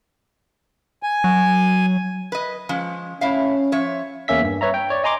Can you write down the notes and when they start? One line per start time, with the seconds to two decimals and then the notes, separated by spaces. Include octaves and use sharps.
1.03 G#5
1.24 F#3
2.32 B4 D#5
2.69 F3 G#3 C#4
3.21 A2 C#4 E5 F5
3.72 F3 C#5 E5
4.28 E2 A#3 C#4 E5 B6
4.42 G2
4.61 B4 C#5 E5 A#5
4.74 G5
4.90 C#5 D5
5.04 D#5 G#5 A#5 C6 D6